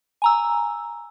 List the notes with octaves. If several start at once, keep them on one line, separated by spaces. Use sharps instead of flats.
G#5 A#5 E6